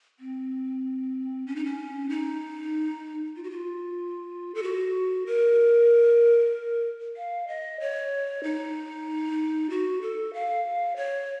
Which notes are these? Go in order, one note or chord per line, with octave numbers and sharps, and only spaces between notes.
C4
C#4
D#4
C#4
D#4
F4
F#4
F4
A4
F#4
A#4
F5
D#5
C#5
D#4
F#4
A4
F5
C#5